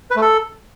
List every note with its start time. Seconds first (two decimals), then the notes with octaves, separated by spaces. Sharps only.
0.11 B4
0.16 A3
0.21 A4